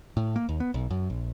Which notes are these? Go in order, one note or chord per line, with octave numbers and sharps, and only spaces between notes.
A2
A#3
D#2
B3
B1
F#2
A#1